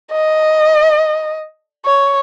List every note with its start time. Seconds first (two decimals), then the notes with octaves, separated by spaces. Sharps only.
0.12 D#5
1.85 C#5